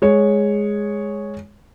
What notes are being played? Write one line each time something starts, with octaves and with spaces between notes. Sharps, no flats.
G#3 C#5